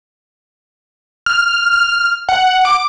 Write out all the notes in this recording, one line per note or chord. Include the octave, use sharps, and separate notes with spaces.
F6
F6
F#5
D6